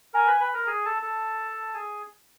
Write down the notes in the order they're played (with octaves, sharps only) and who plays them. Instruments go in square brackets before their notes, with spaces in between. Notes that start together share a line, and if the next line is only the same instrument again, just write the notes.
[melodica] A#4 A#5 [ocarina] G#5
[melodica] B4 B5
B4 B5
A#4 A#5
G#4 G#5
A4 A5
A4 A5
G#4 G#5